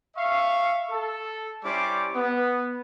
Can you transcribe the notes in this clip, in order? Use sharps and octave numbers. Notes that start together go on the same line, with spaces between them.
E5 F5 C#6
A4
G3 C#4 E4 C5 D5 D6
B3